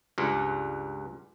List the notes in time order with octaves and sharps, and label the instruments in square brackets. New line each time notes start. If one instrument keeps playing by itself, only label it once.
[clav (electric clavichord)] C#2 G2